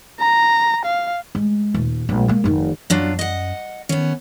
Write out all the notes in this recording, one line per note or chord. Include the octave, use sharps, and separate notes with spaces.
A#5
F5
G#3
D#1
A#1 G#3
G#3 A#3
F1 D#3
F#2 F#3 D4 F4
D#5 F#5
D#3 B3 C#4